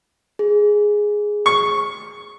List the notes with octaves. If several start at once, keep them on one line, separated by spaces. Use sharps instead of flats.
G#4
C#6